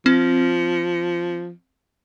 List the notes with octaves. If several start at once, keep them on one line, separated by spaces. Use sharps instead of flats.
F3 C4